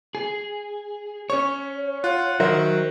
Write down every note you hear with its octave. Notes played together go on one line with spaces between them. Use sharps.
G#4
C#4 C#5 C#6
F4 F#5
D#3 F#3 A#4 C5 E5